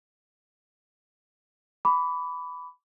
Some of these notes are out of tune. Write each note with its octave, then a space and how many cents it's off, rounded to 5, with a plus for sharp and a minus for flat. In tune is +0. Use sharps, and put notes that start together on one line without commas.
B5 +10 D6 -25